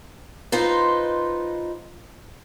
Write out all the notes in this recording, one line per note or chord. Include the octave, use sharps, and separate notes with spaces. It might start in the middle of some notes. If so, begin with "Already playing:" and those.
D#4 F4 B4 C5 D#5